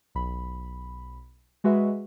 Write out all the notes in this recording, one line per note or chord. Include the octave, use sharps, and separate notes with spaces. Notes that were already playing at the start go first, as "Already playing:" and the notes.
B1 B5
G#3 F#4 G#4 B4 E5